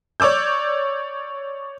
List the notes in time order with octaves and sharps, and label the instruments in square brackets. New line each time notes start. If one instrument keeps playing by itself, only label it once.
[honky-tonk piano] C#5 D5 D6 E6 G6